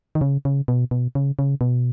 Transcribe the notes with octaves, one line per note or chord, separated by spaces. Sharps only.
D#3
C#3
C#3
B2
B2
C#3
C#3
B2